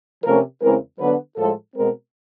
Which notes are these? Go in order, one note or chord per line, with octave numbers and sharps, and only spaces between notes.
C3 F3 A3 C#4 A#4
E2 C#3 E3 G#3 C4 A#4
D3 F#3 B3 D4 B4
A2 F3 G#3 A4
B2 G#3 C4 A#4